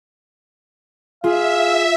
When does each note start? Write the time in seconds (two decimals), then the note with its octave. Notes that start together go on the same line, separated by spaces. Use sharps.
1.24 F4 G#4 E5 F5